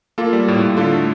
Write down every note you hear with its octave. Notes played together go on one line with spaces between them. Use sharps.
A#3 F4 A4
G3
A2
A2
D3 F4 A4
A3